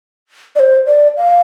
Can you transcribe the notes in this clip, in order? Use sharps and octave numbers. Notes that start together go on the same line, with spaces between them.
D5
C5
D5
F5